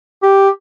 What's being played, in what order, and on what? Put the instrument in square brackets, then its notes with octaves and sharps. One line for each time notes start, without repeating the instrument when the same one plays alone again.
[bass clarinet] G4